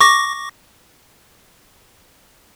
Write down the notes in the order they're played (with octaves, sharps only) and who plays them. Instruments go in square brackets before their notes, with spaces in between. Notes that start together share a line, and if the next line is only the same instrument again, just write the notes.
[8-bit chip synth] C#6 D6 A#6